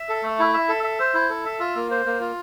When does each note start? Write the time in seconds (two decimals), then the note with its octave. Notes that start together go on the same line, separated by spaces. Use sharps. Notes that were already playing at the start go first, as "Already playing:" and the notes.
Already playing: E5
0.09 A4
0.23 A3
0.39 E4
0.54 E5
0.69 A4
0.84 E5
1.00 C5
1.14 E4
1.29 A4
1.45 E5
1.60 F4
1.76 A#3
1.91 C5
2.06 A#3
2.20 F4